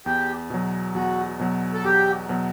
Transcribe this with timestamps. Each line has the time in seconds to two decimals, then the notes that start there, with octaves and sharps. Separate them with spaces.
0.06 E2 G4
0.50 B2 F#3
0.95 E2 F#4
1.40 B2 F#3
1.74 A4
1.84 E2 G4
2.29 B2 F#3